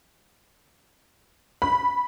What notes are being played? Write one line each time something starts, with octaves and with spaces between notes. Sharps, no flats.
B5